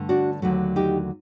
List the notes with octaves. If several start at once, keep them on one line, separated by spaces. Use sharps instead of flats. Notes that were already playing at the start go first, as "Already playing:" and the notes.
Already playing: G2 D3 A3
D4 F#4
D#2 D3 F#3 A3
D#4 G4